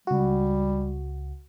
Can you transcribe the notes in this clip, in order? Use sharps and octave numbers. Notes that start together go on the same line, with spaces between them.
C#2 G3 F#4